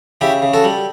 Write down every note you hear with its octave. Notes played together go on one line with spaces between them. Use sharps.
C#3 E4 G4
C#3
F#4 A4
G3